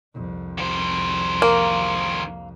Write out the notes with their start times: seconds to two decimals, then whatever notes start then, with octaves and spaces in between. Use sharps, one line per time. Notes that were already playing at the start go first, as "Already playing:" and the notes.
0.14 C2 F2
0.58 D#3 C5
1.42 A#3